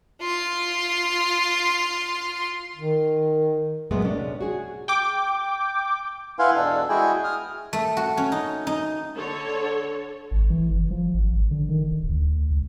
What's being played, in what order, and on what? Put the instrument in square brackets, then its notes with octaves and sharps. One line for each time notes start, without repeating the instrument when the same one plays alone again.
[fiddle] F4 C6
[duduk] D#3
[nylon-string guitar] A#2 F#3 G#3 A3 B3
C3 C#4 D4
F#4 G#4
[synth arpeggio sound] G5 D6
[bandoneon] E4 B4 F5 F#5 G#5 C6
E2 B2 D4 A4
G#3 E4 F#4 G#4 G5 G#5
D#6 F6
[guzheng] A3
F#4
C#4
D#4
D#4
[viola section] D3 A4 C#5
[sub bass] G#1
E3
F#1
F3
G#1
G#1
D3
D#3
D1
D2
C#2